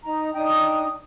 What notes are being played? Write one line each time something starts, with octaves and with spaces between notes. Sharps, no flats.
D#4 A#5
D4 D#4 G5 D#6